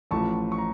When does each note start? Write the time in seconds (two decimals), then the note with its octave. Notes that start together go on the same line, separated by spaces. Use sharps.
0.11 A1 A2 F3 A5 C#6
0.52 C#6
0.58 A#5